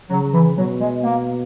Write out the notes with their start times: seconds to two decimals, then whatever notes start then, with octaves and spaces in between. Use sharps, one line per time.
0.10 C#3 F#3
0.34 E3
0.57 B2 F#3
0.81 G#3
1.04 A#3